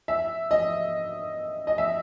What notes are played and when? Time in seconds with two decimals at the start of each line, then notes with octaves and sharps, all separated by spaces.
0.08 E5
0.51 D#5
1.67 D#5
1.78 E5